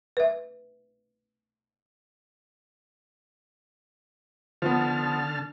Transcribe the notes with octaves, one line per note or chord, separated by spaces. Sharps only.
B4 E5
D3 F3 B3 A5 F6